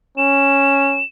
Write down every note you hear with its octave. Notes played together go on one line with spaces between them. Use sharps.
C#4 E7